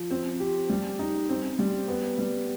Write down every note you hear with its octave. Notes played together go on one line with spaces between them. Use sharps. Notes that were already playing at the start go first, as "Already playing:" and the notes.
Already playing: F3
C4
G4
G3
D#4
C4
G3
B3
G3